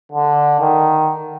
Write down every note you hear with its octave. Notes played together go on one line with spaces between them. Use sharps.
D3
D#3